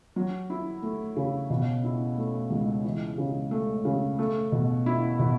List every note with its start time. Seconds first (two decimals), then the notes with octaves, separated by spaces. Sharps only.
0.16 F#3
0.50 E4
0.82 A3
1.16 C#3
1.50 B2
1.84 E4
2.17 A3
2.50 C#2
2.84 E3
3.18 C#3
3.51 A3
3.85 C#3
4.19 A3
4.52 B2
4.86 E4
5.19 B2